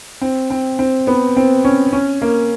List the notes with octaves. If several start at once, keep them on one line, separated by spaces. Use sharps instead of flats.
C4
C4
C4
B3
C4
C#4
C#4
A#3